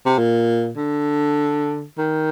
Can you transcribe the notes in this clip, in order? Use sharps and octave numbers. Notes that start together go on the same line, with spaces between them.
C3
A#2
D3
D#3